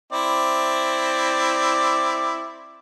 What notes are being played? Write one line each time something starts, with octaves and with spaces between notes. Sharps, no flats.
C4 E4 D5